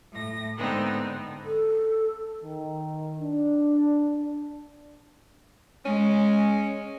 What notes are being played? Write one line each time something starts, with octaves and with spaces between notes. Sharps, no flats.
A2 A#6
G#2 D3 B3 C4 D#4
A4
D#3
D4
G#3 C#4